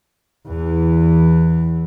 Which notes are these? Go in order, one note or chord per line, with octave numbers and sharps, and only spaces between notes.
E2 E3